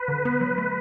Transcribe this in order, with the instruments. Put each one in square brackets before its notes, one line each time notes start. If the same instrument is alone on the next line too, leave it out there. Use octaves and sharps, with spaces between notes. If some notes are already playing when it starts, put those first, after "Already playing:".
Already playing: [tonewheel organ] B4
[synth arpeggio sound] D3
B3
F#3
A3